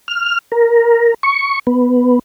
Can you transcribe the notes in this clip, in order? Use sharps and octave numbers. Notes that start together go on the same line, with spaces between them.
F6
A#4
C#6
B3